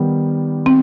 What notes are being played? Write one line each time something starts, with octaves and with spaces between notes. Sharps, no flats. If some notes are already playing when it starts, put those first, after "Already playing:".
Already playing: D#3 G3 B3
C4